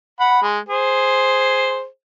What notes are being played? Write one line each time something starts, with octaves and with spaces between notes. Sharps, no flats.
F#5 B5
G#3
G#4 C5